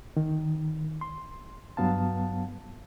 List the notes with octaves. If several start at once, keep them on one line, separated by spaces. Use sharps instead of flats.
D#3
C6
G2 F#3 B3 F5 A5